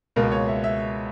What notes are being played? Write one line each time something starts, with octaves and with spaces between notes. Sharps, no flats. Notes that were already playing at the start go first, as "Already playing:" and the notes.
C#2 B2 A#3 A#4
C#5
E5
E5